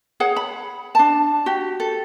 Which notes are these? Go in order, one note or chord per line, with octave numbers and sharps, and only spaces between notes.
G#4 C#5 F#5
B5
D4 A5
F#4 G4
A4